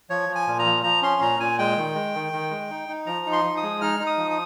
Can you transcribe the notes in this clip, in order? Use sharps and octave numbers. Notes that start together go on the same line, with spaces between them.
F3 C#5
F3
G#5
A#2
A#5
F3
F3 A#5
C#4 C6
A#2 A#5
A#2 G#5
G#3 G5
D#3
G#3
D#3
D#3
G#3
D#4
D#4
F3 A#5
D#4
C6
F3
D#6
G#3
D#4 F6
D#4
D#6
F3
D#6